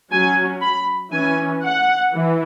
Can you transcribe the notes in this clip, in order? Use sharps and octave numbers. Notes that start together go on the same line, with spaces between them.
F#3 C#4 G#5
B5
E3 C#4 G#5
F#5
E3